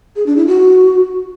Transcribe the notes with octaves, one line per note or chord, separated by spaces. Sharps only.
G#4
D4
E4
F#4